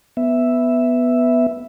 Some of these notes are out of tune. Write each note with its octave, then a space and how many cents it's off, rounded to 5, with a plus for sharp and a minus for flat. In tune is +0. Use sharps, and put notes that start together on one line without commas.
B3 +0 E5 +0